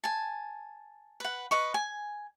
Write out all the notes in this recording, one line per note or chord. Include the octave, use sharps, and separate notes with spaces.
G#5 A5
B4 F#5
B4 D#5 C#6
G#5